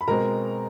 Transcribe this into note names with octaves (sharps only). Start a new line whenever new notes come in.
B5
B2 G#3 C4 A#4 A#5